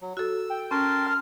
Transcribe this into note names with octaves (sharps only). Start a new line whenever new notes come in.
F#3
F#4 A4 E6
G5
C#4 A#4 A5 C6
F6